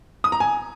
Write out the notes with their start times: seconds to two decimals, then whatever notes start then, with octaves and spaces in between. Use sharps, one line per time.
0.24 D#6
0.32 A#5
0.40 G#5